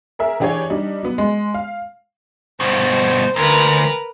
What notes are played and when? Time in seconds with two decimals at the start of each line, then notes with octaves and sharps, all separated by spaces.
0.19 G#4 A#4 E5
0.40 E3 D4 G4 G#4 C#5
0.70 G3 D4 D#4
1.03 F#3 B3
1.18 G#3
1.54 F5
2.60 G2 B2 C5
3.36 D2 A#4 B4